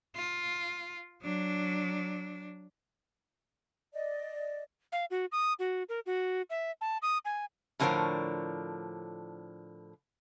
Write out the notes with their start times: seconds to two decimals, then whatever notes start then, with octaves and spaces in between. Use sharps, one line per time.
0.16 F4
1.22 F#3 D4
3.93 D5 D#5
4.92 F5
5.11 F#4
5.32 D#6
5.59 F#4
5.89 A#4
6.06 F#4
6.50 E5
6.81 A5
7.02 D#6
7.25 G#5
7.80 A2 D3 F3 A#4 C5 C#5